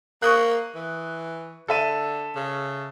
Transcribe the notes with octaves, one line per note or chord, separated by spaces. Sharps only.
A#3 C#6 D#6 F#6
E3
D3 A4 E5 D#7
C#3